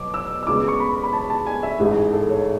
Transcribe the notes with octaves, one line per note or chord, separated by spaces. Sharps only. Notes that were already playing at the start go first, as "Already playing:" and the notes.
Already playing: B2 F#3 B3 D6
E6
E6
D2 C#3 G#3 B3 D6
C#6
B5
B5
A5
A5
G#5
E5
A1 G#2 E3 G#3 G#4
G#4
A4
C#5